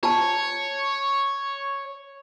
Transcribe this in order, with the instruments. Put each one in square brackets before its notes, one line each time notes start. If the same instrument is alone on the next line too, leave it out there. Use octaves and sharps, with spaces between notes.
[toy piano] F4 A5 [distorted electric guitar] C#5